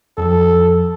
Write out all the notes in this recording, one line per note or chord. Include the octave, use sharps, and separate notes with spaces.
F2 F3 A4